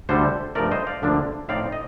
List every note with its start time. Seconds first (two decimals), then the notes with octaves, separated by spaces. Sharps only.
0.09 D2 D3 G3 A4 C5
0.55 G2 F3 A3 A#4 D5
0.71 C5 D#5
0.87 D5 F5
1.02 D2 D3 F3 A#3 D4
1.49 A2 F3 C4 D#4 D5 F5
1.72 D#5